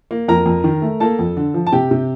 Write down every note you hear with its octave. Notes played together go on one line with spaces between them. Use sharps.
A#3
F2 A#4 A#5
F2
D#3
A3
A#3 A4 A5
F2
D3
F3
A5
C3 G4 G5
C3